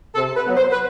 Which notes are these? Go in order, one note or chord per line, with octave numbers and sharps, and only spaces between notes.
C3 A4
B4
F#3 B3
C5
B4